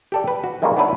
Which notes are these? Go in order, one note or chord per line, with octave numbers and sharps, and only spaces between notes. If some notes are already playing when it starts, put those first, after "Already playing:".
G4 A4 D5
B4
F#4
D#3 G3 G#3 A#3 C#4
B3 D4 E4 B4 C#5 D5